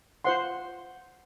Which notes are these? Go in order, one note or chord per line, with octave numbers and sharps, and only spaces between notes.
F4 C5 F#5 C6